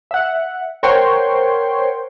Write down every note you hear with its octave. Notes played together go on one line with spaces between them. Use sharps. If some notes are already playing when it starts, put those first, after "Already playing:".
E5 F#5
A#4 C5 C#5 F#5 G5 C6